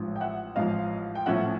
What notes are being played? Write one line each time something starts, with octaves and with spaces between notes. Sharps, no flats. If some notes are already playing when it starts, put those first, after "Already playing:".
Already playing: A1 G#2 F3
G5
E5 F#5
A1 G#2 F3 D#5 F5
G5
A#1 A2 F3 A3 C#4 E5 F#5